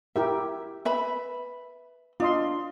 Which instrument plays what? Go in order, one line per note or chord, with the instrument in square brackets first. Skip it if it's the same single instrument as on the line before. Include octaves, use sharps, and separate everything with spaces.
[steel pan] E4 G4 A#4 [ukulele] E5
[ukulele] B4 E5 B5
[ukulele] D4 [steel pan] F4 D#5 C6